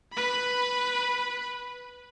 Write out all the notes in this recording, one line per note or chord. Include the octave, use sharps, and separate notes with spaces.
B4 B5